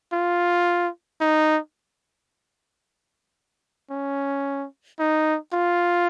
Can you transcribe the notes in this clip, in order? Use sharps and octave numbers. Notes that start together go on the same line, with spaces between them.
F4
D#4
C#4
D#4
F4